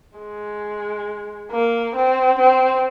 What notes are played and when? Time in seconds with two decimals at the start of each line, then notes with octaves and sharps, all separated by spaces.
0.19 G#3
1.51 A#3
1.95 C4
2.39 C4